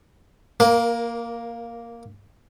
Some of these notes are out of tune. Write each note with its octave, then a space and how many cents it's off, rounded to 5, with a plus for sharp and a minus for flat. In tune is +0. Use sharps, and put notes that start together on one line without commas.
A#3 +0 A#4 +25